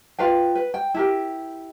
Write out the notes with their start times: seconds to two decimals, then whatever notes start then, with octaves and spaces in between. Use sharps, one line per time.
0.19 F4 B4 F5 G5
0.55 B4
0.74 G5
0.94 E4 G4 A#4